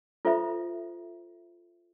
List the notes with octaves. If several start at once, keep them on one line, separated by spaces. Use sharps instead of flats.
F4 A4 C5 E5 B5